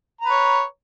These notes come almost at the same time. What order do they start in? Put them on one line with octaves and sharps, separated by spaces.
A#5 B4 C#5